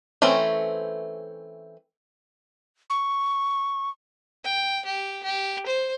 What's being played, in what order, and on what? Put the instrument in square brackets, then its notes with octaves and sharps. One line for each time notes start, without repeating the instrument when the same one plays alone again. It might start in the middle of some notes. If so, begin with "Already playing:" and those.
[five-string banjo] E3 A3 C4 C#4
[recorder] C#6
[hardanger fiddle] G5
G4
G4
C5